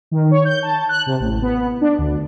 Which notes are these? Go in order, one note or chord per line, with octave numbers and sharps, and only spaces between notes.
D#3
C#5
G6
A5
F#6
C3
A1
B3
D4
D2